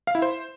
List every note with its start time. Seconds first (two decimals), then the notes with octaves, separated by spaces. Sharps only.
0.07 F5
0.15 E4
0.22 C5